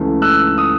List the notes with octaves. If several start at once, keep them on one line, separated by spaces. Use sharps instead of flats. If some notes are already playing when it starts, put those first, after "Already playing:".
Already playing: C#2 C#3 E3 A3
E6 F#6
D#6